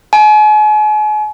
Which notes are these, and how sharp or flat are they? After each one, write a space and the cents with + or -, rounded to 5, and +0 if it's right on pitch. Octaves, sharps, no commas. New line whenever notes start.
G#5 +40